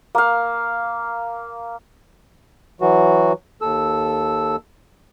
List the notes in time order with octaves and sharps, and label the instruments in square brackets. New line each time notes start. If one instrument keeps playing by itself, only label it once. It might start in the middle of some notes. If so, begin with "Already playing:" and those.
[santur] A#3 F5
[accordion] E3 F#3 F#4
D#2 A4 E6